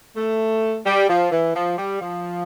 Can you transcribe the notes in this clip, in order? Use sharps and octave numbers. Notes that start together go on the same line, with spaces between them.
A3
G3
F3
E3
F3
G3
F3